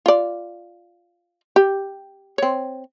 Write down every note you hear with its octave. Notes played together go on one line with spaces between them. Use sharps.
F4 D5
G4
C4 C#5